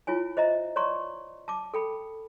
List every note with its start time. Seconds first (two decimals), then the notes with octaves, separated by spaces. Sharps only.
0.07 E4 F4 C#5 G#5
0.37 C5 D#5 E5 A#5
0.76 C#5 D5 A#5 C6 C#6
1.48 A5 D6
1.74 A4 G5 B5